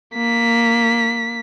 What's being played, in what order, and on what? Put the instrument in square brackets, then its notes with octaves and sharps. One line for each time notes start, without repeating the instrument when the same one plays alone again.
[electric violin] A#3 B6